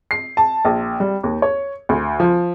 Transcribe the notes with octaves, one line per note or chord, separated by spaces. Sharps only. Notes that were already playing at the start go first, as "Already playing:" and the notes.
C7
A5
A#1
G3
D#2
C#5
D2
F3